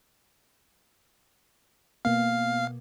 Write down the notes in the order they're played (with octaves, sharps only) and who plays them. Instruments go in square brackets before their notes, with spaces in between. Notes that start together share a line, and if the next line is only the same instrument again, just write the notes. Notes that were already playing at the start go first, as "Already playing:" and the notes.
[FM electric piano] B2 A#3 B3 [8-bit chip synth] F5